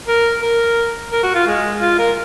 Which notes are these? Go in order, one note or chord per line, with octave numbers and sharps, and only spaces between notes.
A#4
A#4
A#4
F#4
F4
G#3
F4
A#4